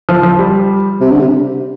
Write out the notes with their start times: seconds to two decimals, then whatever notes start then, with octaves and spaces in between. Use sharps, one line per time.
0.09 F3
0.23 F3
0.39 G3
1.01 C3
1.11 D3
1.20 C3